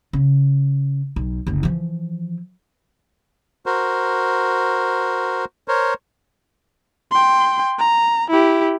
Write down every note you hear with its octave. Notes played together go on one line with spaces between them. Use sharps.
C#3
B1
F#1 D2
E3 F3
F#4 A#4 C5
A#4 C5 C#5
G5 C6
A#5
E4 G4